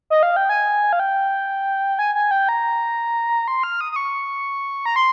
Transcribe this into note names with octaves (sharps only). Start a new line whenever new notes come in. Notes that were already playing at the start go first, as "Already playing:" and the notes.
D#5
F5
G5
G#5
F5
G5
G#5
G#5
G5
A#5
C6
F6
D#6
D#6
C#6
A#5
C6